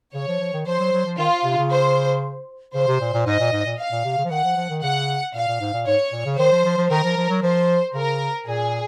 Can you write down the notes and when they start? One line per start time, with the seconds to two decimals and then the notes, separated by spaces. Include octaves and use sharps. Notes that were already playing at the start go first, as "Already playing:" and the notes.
0.14 C#3 C#5
0.28 F3
0.41 F3
0.53 D#3
0.66 F3 C5
0.80 F#3
0.93 F#3
1.06 F3
1.18 D#3 F4
1.44 C3
1.57 C#3
1.71 C5
2.75 C#3 C5
2.88 C3
3.01 A#2
3.14 A#2
3.27 G#2 D#5
3.40 A#2
3.52 G#2
3.66 A#2
3.78 F5
3.92 A#2
4.05 C3
4.18 C#3
4.25 F3
4.30 D#3 F#5
4.44 F3
4.57 F3
4.69 D#3
4.83 C#3 F#5
5.34 A#2 F5
5.47 A#2
5.61 G#2
5.73 A#2
5.87 G#2 C#5
6.12 A#2
6.25 C#3
6.38 D#3 C5
6.52 F3
6.65 F3
6.77 F3
6.90 D#3 A#4
7.04 F3
7.17 F3
7.29 F#3
7.42 F3 C5
7.94 C#3 A#4
8.46 A#2 G#4